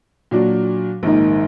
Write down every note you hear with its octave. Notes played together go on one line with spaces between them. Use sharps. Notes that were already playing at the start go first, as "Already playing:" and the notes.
A#2 F#3 D4 F#4
A#1 G#2 D#3 A#3 D#4